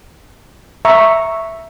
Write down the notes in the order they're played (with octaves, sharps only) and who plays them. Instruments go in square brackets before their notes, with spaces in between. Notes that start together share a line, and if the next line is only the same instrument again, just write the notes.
[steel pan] E5 A#5 C#6